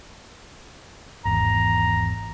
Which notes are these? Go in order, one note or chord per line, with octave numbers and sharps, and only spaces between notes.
G#1 E2 A#5